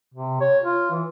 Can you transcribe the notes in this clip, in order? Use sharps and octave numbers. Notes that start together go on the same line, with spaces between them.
C3
C#5
F4
E3